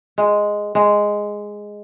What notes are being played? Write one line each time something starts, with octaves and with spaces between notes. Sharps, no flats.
G#3
G#3